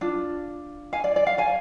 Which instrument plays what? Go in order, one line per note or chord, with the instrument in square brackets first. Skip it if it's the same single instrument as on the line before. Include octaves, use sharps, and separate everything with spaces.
[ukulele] D4 F4
F5 G#5
D5
D5
D5 F5
F5 G#5